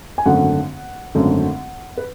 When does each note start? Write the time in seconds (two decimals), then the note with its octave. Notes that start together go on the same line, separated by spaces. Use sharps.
0.18 G#5
0.26 G#1 F#2 D3 A3 F#5
1.15 G#1 F#2 D3 A3
1.97 B4